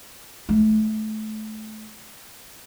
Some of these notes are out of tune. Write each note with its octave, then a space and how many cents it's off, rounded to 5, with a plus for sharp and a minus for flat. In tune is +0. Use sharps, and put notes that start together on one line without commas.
A3 -25